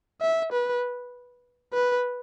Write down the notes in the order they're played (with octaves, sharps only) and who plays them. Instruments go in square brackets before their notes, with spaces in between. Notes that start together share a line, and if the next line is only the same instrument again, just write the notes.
[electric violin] E5
B4
B4